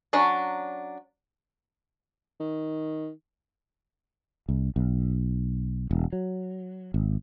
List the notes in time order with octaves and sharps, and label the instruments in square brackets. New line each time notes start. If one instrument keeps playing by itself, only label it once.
[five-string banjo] F#3 C#4 D4 F#4 D5
[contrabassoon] D#3
[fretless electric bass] C2
B1
E1
F#3
G#1